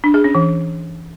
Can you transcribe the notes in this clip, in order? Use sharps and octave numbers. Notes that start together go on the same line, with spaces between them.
D4
G#4
C#4
E3